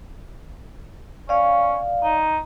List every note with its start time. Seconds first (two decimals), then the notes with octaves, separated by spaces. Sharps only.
1.29 C#4 D5 F5
2.03 D#4